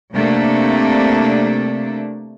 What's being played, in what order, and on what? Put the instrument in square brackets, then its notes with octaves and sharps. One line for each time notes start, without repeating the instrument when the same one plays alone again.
[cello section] C3 A3 A#3 D4